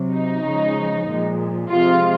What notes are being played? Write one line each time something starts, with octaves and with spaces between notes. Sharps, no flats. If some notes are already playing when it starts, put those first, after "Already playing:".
Already playing: C3 F#3
D#4
C#3 F3 G#3
A#2 F3 G#3
C3 F3 G#3 F4